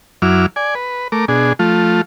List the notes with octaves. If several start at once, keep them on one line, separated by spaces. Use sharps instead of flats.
F#2 F#3 E4 D6 F6
D5 G#5
B4
A3 A#4 D6
B2 D4 G#4
F3 A3 F4